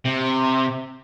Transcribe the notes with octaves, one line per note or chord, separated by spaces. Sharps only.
C3